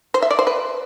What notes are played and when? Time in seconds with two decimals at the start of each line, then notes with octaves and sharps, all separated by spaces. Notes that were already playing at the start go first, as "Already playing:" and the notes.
0.14 C5
0.22 E5
0.31 D5
0.39 C5
0.47 B4